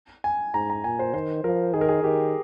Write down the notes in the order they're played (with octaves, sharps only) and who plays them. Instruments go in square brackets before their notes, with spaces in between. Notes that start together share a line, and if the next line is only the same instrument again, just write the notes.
[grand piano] G#5
[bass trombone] G#2 [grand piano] A#5
[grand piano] A#5
[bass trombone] A#2 [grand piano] G#5
[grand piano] C5
[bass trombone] D#3 [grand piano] C5
[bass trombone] F3 [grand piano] A#4
[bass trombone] D#3 [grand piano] G#4
[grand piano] A#4
G#4
[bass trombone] D#3 [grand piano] G4